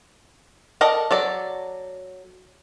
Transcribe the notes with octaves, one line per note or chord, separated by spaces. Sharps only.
A4 A#4 D5 D#5
F#3 A4 D5